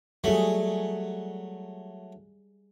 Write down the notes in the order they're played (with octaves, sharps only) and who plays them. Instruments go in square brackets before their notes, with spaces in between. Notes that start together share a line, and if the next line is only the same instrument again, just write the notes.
[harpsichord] F#3 A3 [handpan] G3 G#4